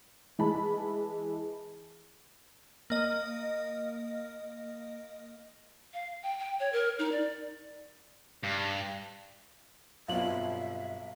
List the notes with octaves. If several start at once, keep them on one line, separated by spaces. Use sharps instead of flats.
E3 G#3 E4 A5 B5
A#3 D#5
F5
G5
G5
C#5
A#4
D#4
D5
G2
B1 G2 B2 C4 F4 E5 F5 F#7